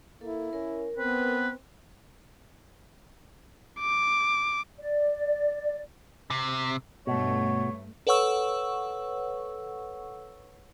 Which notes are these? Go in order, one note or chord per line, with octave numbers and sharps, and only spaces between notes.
A#3 E4 A4
C#4 A#4
B3 C4 B4
D6
D5
C3
G2 B2 A3 C#5
A4 B4 C#5 F#5 C#6 E6